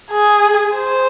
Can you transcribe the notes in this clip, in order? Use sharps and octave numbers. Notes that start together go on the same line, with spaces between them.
G#4
C5